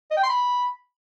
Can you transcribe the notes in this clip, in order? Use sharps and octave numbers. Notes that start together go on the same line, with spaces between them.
D#5
G5
C6
B5